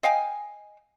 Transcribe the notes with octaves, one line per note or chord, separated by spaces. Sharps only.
D#5 F5 G5 G#5